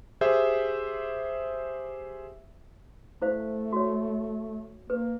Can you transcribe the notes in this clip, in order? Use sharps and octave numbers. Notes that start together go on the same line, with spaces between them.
G4 G#4 C5 E5
A3 E4 C5 F5
F#4 C#5
A#3 B4